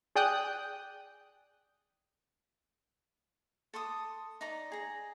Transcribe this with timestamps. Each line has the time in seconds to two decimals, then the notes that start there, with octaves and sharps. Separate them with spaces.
0.16 G#4 D5 G5 D#6 F#6 G6
3.74 A4 C6 D6 D#6
4.41 D#4 D5 A#5
4.72 G#4 A#5